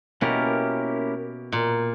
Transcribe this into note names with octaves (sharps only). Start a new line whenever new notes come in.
B2 A#3 C#4 E4 G4 A#4
A#2